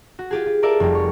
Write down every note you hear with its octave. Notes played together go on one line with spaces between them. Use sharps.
F#4
F4 G4 G#4
F4
A4 A#4 D5 E5 F5 A5
F1 G3
C#5